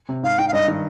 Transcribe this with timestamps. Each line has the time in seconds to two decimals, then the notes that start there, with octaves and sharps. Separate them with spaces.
0.09 C3
0.23 G#2 F5
0.38 D#4 G5
0.48 F5
0.53 G2 D#5
0.68 D#3